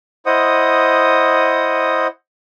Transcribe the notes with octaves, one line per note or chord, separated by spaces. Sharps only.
E4 C5 D#5 F#5 D#6